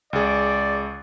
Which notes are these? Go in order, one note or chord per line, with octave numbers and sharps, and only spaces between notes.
C#2 G#4 D5